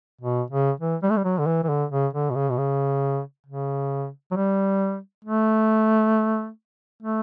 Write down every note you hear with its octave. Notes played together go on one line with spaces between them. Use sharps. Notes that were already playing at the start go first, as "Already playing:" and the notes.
B2
C#3
E3
G3
A3
G3
F#3
D3
E3
E3
D3
C#3
D3
B2
C#3
B2
C#3
C#3
F#3
G3
A3
A3